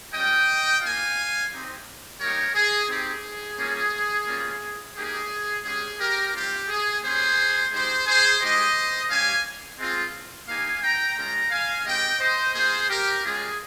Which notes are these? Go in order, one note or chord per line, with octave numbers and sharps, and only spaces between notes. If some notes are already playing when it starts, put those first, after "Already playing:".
G3 C#4 F4 D#5 G5
A#3 F4 F5 G#5
C4 D#4 G4
G3 A#3 D#4 G4 A#4 C#5
G#4
C4 D#4 G4 G#4
G3 A#3 C#4 F4
G3 A#3 C#4 F4
A#3 D#4 G4 G#4
G#3 C#4 G4 G#4
G4 A#4
G3 C4 F4 G4
G#4
A#3 C#4 G4 G#4 C5
G#3 D#4 G4 G#4 C5
G#4 C5
G#3 D#4 G4 C5 D#5
G3 C#4 G4 F5 G#5
G#3 C4 F4
A#3 D#4 G4 F5 G#5
G5 A#5
G#3 C#4 F4 G5 A#5
F5 G#5
G#3 C4 G4 D#5 G5
C5 D#5
A#3 F4 G#4 C5
G4 A#4
G#3 C#4 F4 G#4